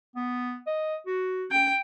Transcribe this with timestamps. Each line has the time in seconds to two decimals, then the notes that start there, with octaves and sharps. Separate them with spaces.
0.15 B3
0.67 D#5
1.07 F#4
1.51 C#4 G5